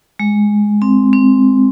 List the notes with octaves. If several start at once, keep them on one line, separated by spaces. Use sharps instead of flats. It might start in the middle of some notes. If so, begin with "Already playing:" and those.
G#3
C4
C4